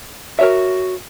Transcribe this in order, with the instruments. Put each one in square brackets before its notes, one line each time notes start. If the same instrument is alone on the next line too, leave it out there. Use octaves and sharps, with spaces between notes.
[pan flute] F#4 [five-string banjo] A#4 C#5 E5